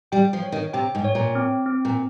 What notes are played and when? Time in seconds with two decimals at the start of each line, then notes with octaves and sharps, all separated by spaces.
0.12 G3 G5
0.33 F3
0.42 C#5
0.52 D#3
0.73 C3 G5
0.95 G#2
1.04 C#5
1.15 A#2
1.35 C4
1.66 C4
1.85 A#2